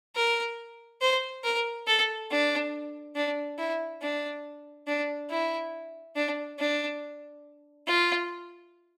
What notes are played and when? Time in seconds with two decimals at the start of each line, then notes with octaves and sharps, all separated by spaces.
0.16 A#4
1.01 C5
1.44 A#4
1.87 A4
2.31 D4
3.16 D4
3.59 E4
4.02 D4
4.87 D4
5.30 E4
6.16 D4
6.59 D4
7.87 F4